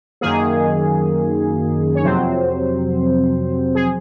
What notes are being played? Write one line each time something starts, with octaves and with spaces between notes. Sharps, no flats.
F#2 D#3 A#3 G#4
C#5
F2 C3 F#3 C4 C5
G#4